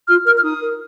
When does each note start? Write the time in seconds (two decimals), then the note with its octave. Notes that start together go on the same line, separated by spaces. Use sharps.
0.08 F4 F6
0.26 A#4 F6
0.39 F6
0.44 D#4 D#6
0.62 A#4